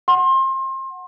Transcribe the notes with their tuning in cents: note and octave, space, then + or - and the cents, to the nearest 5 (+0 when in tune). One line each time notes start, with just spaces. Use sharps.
F#5 +0 C6 +30